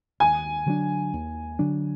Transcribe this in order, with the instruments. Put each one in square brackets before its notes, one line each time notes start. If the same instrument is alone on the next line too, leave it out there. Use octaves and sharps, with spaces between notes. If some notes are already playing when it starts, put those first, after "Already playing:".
[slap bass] D#2 [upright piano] G#5
[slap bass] D3 F#3 D4
D#2
D3 F#3 D4